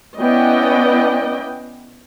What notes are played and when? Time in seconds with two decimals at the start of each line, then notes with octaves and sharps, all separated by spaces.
0.20 B3 C#4 E4 D5 D#5 G5